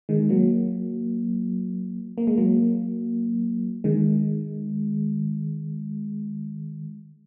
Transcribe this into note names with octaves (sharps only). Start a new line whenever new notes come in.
D#3 G#3
F#3 A#3
A#3
G#3
F#3 A#3
D#3 G#3